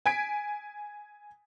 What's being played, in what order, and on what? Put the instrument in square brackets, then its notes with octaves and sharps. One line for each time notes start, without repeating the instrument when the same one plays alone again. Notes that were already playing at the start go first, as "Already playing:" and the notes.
[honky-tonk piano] G#5 G#6 B6 D7